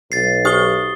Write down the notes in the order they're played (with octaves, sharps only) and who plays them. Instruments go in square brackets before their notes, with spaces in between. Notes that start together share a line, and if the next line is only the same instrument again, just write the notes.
[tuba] B1 [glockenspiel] A6 C7
[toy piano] G4 C5 [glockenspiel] D#6 G7